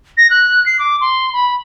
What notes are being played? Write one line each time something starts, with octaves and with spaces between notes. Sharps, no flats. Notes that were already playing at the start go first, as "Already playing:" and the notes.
A#6
F#6
C7
D6
C6
B5